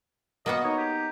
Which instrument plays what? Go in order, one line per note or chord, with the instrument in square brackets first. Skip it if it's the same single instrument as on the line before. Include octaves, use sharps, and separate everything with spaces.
[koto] A#3 B3 F#4 [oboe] D#5
[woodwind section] D#4 [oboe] C#5
[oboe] G4